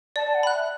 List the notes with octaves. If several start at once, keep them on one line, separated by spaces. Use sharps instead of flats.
D5 A5
A5
F#5
B5 F#6
E5